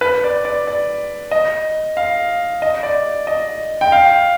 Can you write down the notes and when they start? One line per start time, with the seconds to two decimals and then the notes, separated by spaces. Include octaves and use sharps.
0.01 B4
0.24 D5
0.45 D5
0.67 D5
1.31 D#5
1.97 F5
2.62 D#5
2.83 D5
3.27 D#5
3.81 G5
3.92 F5